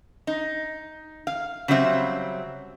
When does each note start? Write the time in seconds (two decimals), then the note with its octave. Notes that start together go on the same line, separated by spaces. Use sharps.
0.27 D#4
1.27 F5
1.68 C#3 F#3 G3 C4 E5